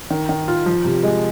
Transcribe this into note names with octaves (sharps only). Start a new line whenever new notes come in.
D#3
D#3
F4
F3
C3
G#3